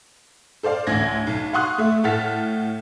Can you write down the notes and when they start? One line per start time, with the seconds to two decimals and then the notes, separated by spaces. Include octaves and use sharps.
0.63 A4 C5 D5 F5
0.87 A1 D2 G#6 A#6
1.27 B1
1.53 F5 F#5 C6 C#6 D#6 F#6
1.78 A3 E5
2.04 A2 A4 F#5 F6 A6 B6